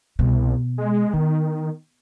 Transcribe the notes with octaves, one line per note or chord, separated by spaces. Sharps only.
C2 B2
G#3
D#3 B3